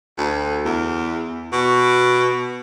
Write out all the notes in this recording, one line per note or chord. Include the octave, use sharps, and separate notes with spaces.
D2
E2
B2